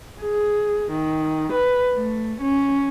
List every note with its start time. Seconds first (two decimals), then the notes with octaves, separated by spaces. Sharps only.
0.20 G#4
0.91 D#3
1.51 B4
1.95 A3
2.41 C#4